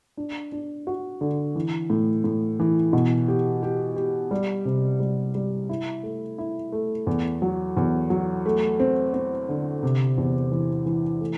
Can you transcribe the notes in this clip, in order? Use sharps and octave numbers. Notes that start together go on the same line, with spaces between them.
D4
D4
F#4
D3
E3
A2
A2
E3
B2
G4
G4
G4
G3
C3
G3
G3
E4
A3
E4
A3
E2
F#3
E2
F#3
A3
C4
C4
D3
C3
E2
E3
E3
A3